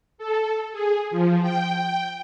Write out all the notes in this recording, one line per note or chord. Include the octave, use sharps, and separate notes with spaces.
A4
G#4
F3
G5